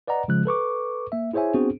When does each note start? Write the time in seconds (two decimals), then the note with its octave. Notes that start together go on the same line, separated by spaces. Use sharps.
0.07 B4 D5 D#5 F#5 A#5
0.28 C#3 F3 G#3 F#6
0.45 A4 B4 C#6 D6
1.12 A#3 E5
1.33 E4 G#4 C5 C#5 E5 G#5
1.54 B3 C4 D4 F#4 G#4 C5